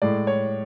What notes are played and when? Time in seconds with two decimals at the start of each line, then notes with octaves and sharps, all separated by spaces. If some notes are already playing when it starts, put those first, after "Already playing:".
0.02 A2 G#3 D5
0.27 C#5